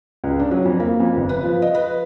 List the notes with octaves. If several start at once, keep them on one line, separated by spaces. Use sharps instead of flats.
C#2
D4
F#3
F2
A#3
F2
G1
B4
F3
D#5
B4
B4